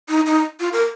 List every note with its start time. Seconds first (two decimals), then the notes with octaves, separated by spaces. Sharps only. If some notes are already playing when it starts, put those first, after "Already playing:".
0.09 D#4
0.26 D#4
0.60 F4
0.73 A#4